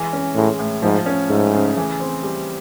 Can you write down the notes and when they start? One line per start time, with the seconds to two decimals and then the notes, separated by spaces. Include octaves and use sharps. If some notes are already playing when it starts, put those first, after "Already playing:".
Already playing: E3 G#3
0.13 C#4
0.35 A2 G#3
0.59 A2
0.82 G#2 F3
1.06 C#4
1.29 G#2 A3
1.54 C#3
1.77 E3
2.00 C4
2.23 G3